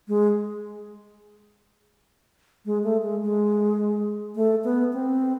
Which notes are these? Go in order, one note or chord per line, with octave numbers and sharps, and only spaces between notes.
G#3
G#3
A3
G#3
G#3
A3
B3
C4